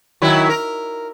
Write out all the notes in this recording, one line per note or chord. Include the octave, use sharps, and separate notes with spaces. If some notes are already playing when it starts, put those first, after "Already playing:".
D#3 F#3 E4
A#4